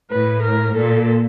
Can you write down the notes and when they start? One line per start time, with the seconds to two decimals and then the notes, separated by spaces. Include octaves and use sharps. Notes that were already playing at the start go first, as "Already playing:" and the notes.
0.11 A2 B4
0.43 A#4
0.75 A#2 A4